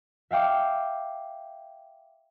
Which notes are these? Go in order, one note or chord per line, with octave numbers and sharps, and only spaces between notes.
E5 F5 G5 D6